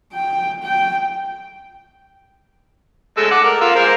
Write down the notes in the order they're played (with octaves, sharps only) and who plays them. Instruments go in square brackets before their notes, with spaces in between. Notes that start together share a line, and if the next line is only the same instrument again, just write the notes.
[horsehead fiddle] G5
G5
[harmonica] G#3 A3 E6
F#5 D6
A#4
F4 E6
G#3 A#4 C5